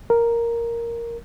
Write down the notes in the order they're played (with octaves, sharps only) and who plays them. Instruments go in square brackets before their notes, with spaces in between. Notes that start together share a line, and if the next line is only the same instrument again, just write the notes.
[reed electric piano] A#4